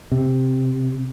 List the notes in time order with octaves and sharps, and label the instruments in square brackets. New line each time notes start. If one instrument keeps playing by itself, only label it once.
[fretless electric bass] C3